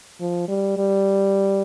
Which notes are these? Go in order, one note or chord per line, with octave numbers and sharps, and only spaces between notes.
F3
G3
G3